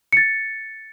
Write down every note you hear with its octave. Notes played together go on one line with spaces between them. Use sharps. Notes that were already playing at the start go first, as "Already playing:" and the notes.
A6 C#7